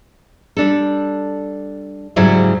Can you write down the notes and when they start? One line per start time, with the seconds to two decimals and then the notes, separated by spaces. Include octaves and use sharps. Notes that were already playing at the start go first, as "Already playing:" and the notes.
0.57 G3 D4 A4
2.16 G#2 C#3 F#3 G3 E4 C5